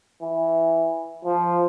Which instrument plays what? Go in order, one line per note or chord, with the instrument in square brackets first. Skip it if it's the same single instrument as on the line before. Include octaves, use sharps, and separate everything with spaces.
[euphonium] E3
F3